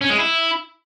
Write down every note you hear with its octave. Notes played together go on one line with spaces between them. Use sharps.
C#4
G#3
E4